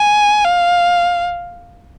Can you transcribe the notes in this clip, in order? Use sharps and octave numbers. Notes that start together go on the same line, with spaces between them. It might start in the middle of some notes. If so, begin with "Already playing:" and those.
Already playing: G#5
F5